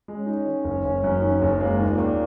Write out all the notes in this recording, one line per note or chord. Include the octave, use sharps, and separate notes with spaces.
G#3
C#4
D#4
D#3
F#1
F#1
F#2
D#3
F#1
G#3 A#3
D#2
A#2
D#2